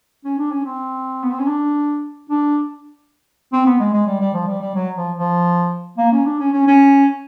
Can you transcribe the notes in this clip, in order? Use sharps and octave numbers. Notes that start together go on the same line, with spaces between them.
C#4
D4
C#4
C4
B3
C4
C#4
D4
D4
C4
B3
G#3
G#3
G3
G3
F3
G3
G3
F#3
F3
F3
A#3
C#4
D4
C#4
C#4
C#4